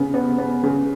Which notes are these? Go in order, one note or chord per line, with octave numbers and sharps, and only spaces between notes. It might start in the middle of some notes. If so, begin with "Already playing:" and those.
Already playing: C#3 B3
B3
B3
C#3